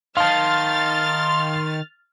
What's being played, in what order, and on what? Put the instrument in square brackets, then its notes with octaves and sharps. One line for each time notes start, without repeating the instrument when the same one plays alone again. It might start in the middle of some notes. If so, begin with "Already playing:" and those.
[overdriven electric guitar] D#3 [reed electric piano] F5 A5 [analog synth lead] C6 [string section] F6 A6